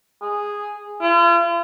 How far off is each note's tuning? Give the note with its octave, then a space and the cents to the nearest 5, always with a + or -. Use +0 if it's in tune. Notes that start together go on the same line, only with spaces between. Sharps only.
G#4 -5
F4 -45